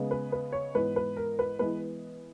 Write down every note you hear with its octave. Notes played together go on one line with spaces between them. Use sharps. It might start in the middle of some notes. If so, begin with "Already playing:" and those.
Already playing: C#3 G#3 B3
B4
B4
C#5
G#2 E3 B3 B4
B4
A#4
B4
E3 G#3 B3 B4